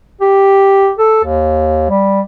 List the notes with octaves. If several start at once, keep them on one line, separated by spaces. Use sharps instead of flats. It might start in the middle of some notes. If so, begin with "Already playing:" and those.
G4
A4
D#2
G3